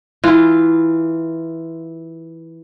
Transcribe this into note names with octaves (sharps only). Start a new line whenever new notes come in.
E3 F4